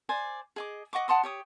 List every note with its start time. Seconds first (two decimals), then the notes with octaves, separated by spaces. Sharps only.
0.09 C5 D5 G#5
0.56 G#4 D#5 D6
0.93 D#5 F#5 C#6 D6
1.08 F#5 A5 C6 D#6
1.23 G4 C#5 D#6